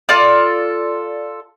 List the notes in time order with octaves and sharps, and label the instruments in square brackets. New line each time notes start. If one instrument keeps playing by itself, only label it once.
[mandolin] F4 A4 D5